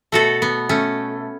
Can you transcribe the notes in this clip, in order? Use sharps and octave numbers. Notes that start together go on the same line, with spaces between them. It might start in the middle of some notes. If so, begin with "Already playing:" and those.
B2 A3 F#4 A4
B3
A3 C#4